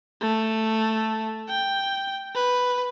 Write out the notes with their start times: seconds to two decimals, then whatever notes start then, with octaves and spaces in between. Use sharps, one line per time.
0.21 A3
1.49 G5
2.35 B4